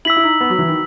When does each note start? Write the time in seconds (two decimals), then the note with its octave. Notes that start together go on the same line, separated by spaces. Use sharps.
0.05 E4 E6 B6 F#7
0.17 E4
0.23 D#4
0.41 B3
0.50 F#3
0.59 E3
0.68 D#3